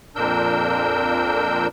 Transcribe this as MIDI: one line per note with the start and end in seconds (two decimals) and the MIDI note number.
0.16 1.67 41
0.16 1.67 46
0.16 1.67 62
0.16 1.67 70
0.16 1.67 88
0.16 1.67 91